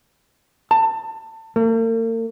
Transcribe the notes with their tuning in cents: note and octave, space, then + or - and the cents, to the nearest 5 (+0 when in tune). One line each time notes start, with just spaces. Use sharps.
A5 +25
A#3 -45